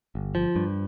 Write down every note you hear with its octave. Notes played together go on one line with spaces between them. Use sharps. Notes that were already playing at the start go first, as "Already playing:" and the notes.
G1
F3
G2